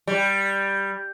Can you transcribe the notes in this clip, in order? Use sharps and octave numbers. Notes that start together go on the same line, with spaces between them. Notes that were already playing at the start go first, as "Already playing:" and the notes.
G3